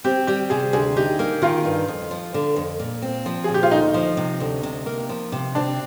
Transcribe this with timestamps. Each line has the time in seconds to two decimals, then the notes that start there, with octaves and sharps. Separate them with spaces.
0.04 C4 G4
0.27 G3 G4
0.50 C3 G#4
0.73 D2 G#4
0.96 D#4 G4
1.19 A#3
1.42 D#3 F4
1.65 G2
1.88 F2
2.11 F3
2.34 D3
2.56 F2
2.80 A#2
3.02 C4
3.26 F3
3.44 G#4
3.48 A#2
3.54 G4
3.63 F4
3.71 D2 D#4
3.94 F3
4.17 C3
4.40 D2
4.63 C3
4.86 A#3
5.09 F3
5.32 C3
5.55 C4 D4